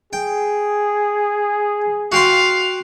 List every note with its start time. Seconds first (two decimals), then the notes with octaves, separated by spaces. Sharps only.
0.13 G#4 G5
2.12 F#4 F5 G5 C6